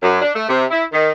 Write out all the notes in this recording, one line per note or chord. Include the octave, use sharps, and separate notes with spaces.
F#2
D4
A3
C3
E4
D#3